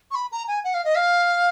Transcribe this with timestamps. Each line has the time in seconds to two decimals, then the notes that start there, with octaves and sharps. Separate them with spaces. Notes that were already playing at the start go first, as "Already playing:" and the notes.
0.11 C#6
0.15 B5
0.32 A#5
0.48 G#5
0.64 F#5
0.74 F5
0.85 D#5
0.95 F5